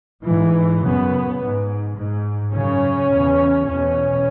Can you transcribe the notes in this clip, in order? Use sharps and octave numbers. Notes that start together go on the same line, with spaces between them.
G#2 E3
F#2 C#3 B3
G#2
G#2
F#2 C#3 C#4
E2 C#3
E2 B2 C#4